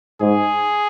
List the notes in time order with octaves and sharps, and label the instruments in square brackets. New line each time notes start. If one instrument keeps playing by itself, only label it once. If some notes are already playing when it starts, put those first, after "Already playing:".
[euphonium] G#2 [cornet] G#4